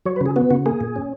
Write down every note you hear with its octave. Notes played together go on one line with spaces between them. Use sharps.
F#3 C#5
B4
C#3 G#4
B3 F#4
C#3 F#4
A#3 G#4
A#2
C#4